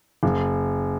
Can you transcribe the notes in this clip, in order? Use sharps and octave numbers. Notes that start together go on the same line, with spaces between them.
F#1